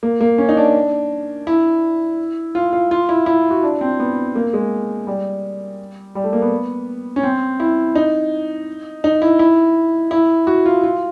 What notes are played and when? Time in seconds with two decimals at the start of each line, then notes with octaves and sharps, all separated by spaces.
0.03 A#3
0.21 A#3
0.38 C#4
0.49 D#4
0.57 D4
1.47 E4
2.55 F4
2.73 F4
2.91 F4
3.09 E4
3.26 E4
3.51 F#4
3.63 D4
3.81 C4
3.99 B3
4.36 A#3
4.53 G#3
5.07 G3
6.15 G3
6.24 A3
6.33 A#3
6.42 B3
7.16 C#4
7.23 C4
7.60 E4
7.96 D#4
9.04 D#4
9.22 E4
9.39 E4
10.11 E4
10.47 F#4
10.66 F4
10.84 F4